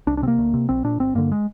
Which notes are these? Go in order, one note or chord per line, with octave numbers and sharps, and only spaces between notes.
C2 D4
D4
C3 C4
A#3
D2
C3
A#1 C4
A#2 D4
G1 C4
G2 D3 A#3
G#3